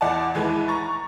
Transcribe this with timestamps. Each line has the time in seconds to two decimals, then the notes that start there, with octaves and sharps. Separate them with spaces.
0.01 E2 D5 F#5 A5
0.35 D#2 E3 G#3 B4
0.68 A#5 C#6 A6